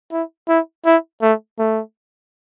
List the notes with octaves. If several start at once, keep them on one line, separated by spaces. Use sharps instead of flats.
E4
E4
E4
A3
A3